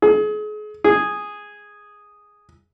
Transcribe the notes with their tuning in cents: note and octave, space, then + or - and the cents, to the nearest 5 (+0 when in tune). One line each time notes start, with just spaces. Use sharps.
G#4 +35
G#4 -5